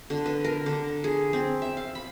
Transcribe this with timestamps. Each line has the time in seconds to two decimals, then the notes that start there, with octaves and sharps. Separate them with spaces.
0.10 D3
0.26 B4
0.44 A#4
0.66 D3
1.04 G#4
1.33 C4
1.62 E5
1.77 F5
1.95 B5